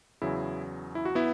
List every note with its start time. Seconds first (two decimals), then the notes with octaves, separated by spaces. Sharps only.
0.22 E2 C#3 F#3 E4 G#4
0.95 E4
1.05 F#4
1.15 B3 E4